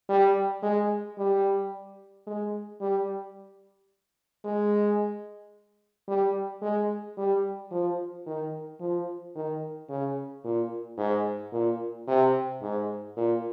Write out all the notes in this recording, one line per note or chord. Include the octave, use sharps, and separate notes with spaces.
G3
G#3
G3
G#3
G3
G#3
G3
G#3
G3
F3
D#3
F3
D#3
C#3
A#2
G#2
A#2
C3
G#2
A#2